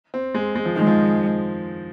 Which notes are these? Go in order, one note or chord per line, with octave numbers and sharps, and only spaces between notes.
C4
G#3
G#3
F3
D#3 G#3
F3